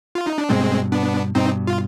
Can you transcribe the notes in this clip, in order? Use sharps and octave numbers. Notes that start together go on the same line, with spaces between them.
F4
D#4
D4
G2 B2 G#3 C4
B3 D4
G2 B2 C4 D#4
F4